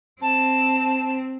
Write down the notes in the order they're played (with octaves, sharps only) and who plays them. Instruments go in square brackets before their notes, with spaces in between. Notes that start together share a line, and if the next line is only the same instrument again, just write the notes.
[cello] C4 [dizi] A5